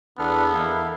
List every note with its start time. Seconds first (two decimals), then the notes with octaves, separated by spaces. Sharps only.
0.19 E2 B3 D4 A4 F6
0.55 E2 E4 A4 A#4 D#5 F5